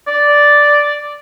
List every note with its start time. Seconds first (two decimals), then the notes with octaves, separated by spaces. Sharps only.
0.07 D5